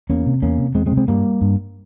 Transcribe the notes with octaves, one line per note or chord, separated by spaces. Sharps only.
E2 A#3 C#4
C3
E2 A#3 C#4
C3
E2 G#3 C4
G#3 C4
C3
G#3 C4
G2 G3 A#3
G2